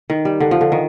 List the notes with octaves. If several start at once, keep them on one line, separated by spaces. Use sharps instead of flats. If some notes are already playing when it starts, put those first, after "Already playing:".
D#3
G3
D3
F3
D3
D#3